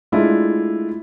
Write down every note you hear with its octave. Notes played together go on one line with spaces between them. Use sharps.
G#3 A3 D4 E4 F4